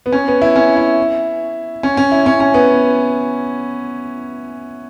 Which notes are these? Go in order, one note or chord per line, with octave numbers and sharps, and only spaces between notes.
B3
C#4
B3
E4
C#4
E4
C#4
C#4
E4
C#4
C#4
B3